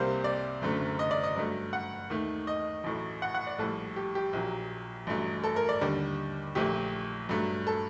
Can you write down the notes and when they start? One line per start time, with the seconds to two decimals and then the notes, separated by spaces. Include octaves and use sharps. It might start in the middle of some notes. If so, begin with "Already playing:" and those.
Already playing: C2 C3 G3 A#3 C5
0.24 D5
0.62 F#1 F#2 D3 A3
0.99 D#5
1.11 D5
1.23 D#5
1.36 G2 F#3 A3
1.73 F#5
2.10 D#2 D#3 A3
2.47 D#5
2.84 A1 A2 F#3 A3
3.22 F#5
3.34 F#5
3.47 D5
3.59 A#1 A2 G3 A4
3.96 G4
4.15 G4
4.33 A#1 A#2 F#3
5.07 A1 G2 F#3 A3
5.44 A4
5.56 A#4
5.69 D5
5.81 D#2 D3 G3
6.55 A#1 A#2 A3 G4
7.29 G2 F#3 A3
7.67 A4